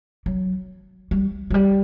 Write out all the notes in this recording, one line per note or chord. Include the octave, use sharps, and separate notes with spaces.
F#3
G3
F#3
G3